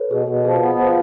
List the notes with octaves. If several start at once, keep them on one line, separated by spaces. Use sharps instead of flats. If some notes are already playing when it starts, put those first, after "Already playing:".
Already playing: A4 B4 C#5
B2 G#4
B2
F3 G#4
B3
F3